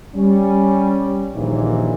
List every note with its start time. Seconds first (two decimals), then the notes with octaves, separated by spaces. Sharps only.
0.15 G3 C#4
1.35 A#1 D#2 A#2 E3 A#3 D#4